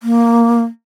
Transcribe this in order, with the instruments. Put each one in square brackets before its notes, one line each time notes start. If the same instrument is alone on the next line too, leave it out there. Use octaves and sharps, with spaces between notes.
[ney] A#3